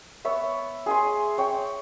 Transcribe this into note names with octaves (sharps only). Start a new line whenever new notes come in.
B3 C#5 E5
G#4 G#5 C6
C#5 G5